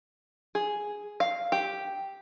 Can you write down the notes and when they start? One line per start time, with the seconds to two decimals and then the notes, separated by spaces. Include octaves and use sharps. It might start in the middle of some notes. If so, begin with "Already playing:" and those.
0.55 G#4
1.20 F5
1.52 G4